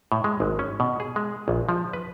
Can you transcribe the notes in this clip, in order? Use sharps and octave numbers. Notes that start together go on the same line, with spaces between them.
A2
G#3
G#1
C#4
B2
G#4
G#3
A#1
F3
B4